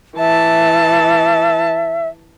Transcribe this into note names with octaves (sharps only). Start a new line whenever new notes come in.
E3 E5 A5